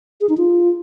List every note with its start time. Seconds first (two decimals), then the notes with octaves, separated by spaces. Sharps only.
0.21 G#4
0.29 D#4
0.37 F4